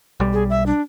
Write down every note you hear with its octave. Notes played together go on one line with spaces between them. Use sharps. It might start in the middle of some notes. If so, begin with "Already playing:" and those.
B1 G3
G#4
E5
D4